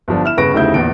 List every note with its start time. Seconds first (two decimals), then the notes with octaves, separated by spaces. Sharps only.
0.08 G1 F3 D4
0.24 E4 F6 E7
0.37 G1 C#3 B4 C#6 A#6 D7
0.54 F1 D2 C#3 D#4 E4 G6
0.74 A#1 E2 D7